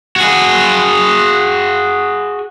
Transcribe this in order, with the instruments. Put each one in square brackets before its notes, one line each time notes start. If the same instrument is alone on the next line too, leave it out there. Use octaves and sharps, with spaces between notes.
[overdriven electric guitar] F#4 G#4